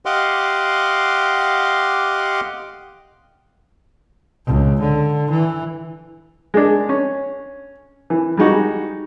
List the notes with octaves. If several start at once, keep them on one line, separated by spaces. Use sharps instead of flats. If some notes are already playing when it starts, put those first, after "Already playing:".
G4 D#5 F5 F#5 C6 D6
C#2
D3
E3
G#3 D4
C#4
E3
G3 G#3 D#4 F#4